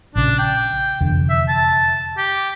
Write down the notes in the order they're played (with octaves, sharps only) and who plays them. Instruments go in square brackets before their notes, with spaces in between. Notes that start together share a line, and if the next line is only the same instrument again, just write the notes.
[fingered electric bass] A#1 C#3 [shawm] D4
[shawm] G5
[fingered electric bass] F1 E2 D3
[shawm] E5
A5
G4